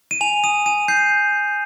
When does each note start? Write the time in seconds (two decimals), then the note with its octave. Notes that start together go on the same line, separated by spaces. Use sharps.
0.11 D#7
0.21 G#5 F7
0.44 D#6 D#7
0.66 G#5 D#7
0.88 G6 C7